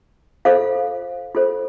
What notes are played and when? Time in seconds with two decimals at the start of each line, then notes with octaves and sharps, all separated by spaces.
0.45 F4 A4 C5 F5
1.35 F4 A4 C5